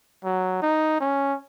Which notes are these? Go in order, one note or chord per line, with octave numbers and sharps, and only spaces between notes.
F#3
D#4
C#4